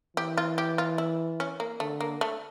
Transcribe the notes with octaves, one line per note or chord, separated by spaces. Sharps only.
E3 G4
F4
G4
F4
E4
C#4
A#3
D3 A3
A#3
A3